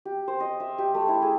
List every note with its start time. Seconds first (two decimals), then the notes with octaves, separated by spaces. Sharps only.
0.05 G4
0.28 C5
0.40 D#5
0.60 E5
0.78 G4
0.94 A3
1.09 E4
1.22 G#4